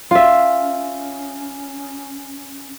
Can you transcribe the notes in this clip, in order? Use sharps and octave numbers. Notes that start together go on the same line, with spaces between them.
C#4 F4 E5